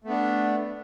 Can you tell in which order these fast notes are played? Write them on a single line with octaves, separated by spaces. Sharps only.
A3 B3 D4